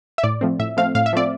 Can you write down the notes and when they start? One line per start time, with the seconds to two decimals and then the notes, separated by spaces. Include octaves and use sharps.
0.18 E5
0.23 A2 D5
0.41 F3 A3 C4
0.59 A2 E5
0.77 F3 A3 C4 F5
0.95 A2 F5
1.06 E5
1.13 F3 A3 C4 D5